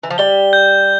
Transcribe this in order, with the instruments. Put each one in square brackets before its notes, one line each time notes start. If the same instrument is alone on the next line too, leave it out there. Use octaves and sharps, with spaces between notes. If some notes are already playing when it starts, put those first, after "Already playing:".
[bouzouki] E3
F3
[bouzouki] G3 [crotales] G7
[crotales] G6